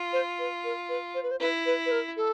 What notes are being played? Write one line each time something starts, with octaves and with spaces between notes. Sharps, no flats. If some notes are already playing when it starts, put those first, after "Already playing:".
Already playing: F4
C5
B4
A#4
B4
C5
B4
C5
E4 B4
B4
B4
A#4
A4